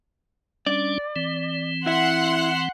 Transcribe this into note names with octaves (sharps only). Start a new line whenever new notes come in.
G3 C#4 D4 D5
E3 C4
E4 E5 F#5 C6 F#6